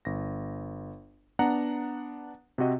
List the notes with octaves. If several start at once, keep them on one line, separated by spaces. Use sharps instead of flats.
G1 A#6
B3 D4 F#5 A#5
C3 C4 F#4 D#5